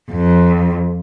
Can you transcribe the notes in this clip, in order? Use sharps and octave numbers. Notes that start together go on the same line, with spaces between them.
F2